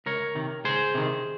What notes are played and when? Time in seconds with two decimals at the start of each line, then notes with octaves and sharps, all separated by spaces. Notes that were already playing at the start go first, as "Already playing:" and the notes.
0.06 C#2 A#4 C#5
0.35 C3 D#3
0.64 C#2 G#4 C5
0.95 C3 D#3